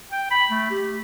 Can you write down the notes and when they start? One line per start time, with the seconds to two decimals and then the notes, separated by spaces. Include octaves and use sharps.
0.11 G5
0.31 B5
0.51 A3
0.71 G4